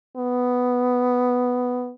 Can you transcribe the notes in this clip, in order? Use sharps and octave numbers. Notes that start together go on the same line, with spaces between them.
B3